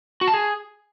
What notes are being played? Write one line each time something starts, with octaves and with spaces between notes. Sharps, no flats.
F#4
A5
G#4